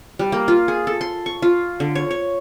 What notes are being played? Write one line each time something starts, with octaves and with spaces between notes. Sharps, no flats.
G3
A#3
F4
G#4
A4
C6
C#6
F4
D3
C#5
C#5